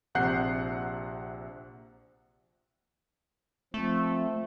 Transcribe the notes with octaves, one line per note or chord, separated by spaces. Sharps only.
A#1 C3 F#5 F#6 G6 C7
F3 A3 C4